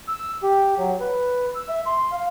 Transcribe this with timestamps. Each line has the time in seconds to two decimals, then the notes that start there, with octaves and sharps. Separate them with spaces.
0.08 E6
0.43 G4
0.78 F#3
1.00 B4
1.55 E6
1.69 E5
1.86 C6
2.12 F5